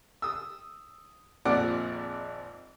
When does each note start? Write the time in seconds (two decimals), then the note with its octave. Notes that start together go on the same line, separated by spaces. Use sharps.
0.22 D#6 E6
1.45 G#1 F2 A#2 F3 D5 F#5